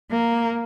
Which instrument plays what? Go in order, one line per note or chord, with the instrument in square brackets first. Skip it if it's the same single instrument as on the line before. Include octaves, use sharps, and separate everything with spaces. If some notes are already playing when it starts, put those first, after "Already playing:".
[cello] A#3